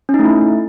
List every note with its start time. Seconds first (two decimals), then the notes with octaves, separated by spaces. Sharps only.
0.09 C#4
0.14 D#4
0.19 A3
0.24 E4